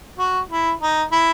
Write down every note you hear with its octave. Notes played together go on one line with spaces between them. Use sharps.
F#4
E4
D#4
E4